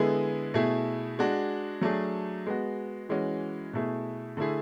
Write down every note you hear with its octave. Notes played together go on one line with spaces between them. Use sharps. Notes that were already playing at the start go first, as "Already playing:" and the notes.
Already playing: D3 G#3 B3 E4 G#4
B2 A3 E4 G#4
G#3 D4 F#4
F#3 A3 D4 G#4
G#3 B3 F#4
E3 G#3 C#4 F#4
B2 A3 E4 G#4
D3 A3 E4 G#4